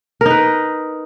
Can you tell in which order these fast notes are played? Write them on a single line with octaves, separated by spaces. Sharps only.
A#4 D#4 B4